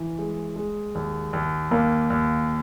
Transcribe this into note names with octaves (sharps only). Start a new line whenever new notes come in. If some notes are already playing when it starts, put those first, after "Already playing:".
Already playing: E3
G#3
G#3
D#2
D#2
D#2 A#3
D#2